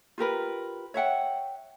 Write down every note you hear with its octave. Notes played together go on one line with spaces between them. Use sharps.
F4 G4 A#4 B4
C#5 E5 F#5 G5